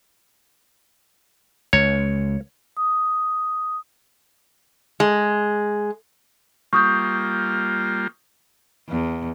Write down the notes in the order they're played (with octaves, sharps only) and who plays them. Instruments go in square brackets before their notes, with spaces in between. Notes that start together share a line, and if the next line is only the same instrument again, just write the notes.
[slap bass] C#2 [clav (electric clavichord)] C#5
[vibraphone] D#6
[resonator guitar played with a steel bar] G#3
[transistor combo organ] G3 A#3 F4 [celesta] C#6 D#6 G6
[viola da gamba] E2